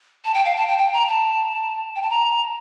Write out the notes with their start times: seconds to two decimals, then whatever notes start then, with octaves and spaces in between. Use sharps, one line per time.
0.25 A5
0.34 G5
0.45 F5
0.56 A5
0.68 G5
0.79 G5
0.93 A#5
1.08 A5
1.96 G5
2.02 A5
2.10 A#5